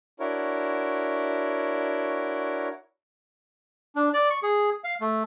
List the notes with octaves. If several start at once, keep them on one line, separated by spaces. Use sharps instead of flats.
D4 E4 F#4 A#4 C#5
D4
D5
C#6
G#4
F5
A3